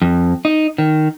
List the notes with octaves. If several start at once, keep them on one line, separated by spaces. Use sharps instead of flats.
F2
D#4
D#3